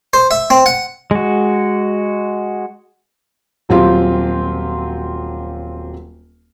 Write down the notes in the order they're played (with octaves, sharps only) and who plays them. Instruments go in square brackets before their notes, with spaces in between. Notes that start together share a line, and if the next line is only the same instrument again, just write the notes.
[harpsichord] C5
E5
C4
F#5
[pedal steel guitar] G#3 F#4
[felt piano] D#1 F#3 C4 F4 G4 F5